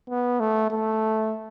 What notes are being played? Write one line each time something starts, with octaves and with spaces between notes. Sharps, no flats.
B3
A3
A3